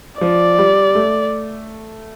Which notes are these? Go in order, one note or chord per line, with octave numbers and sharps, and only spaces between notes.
F3 D5
G3
A3